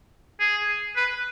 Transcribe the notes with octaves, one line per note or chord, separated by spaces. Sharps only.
G#4
B4